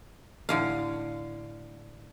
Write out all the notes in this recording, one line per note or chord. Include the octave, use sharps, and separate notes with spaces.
A2 D3 F5